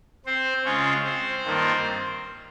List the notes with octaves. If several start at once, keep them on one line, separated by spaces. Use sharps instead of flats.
C4 C5
C#3 G#3 C#4 F4 C#5
C4 C5
G2 D#3 A#3 F4